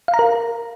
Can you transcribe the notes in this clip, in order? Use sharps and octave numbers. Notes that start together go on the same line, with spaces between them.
F5
A#5
A#4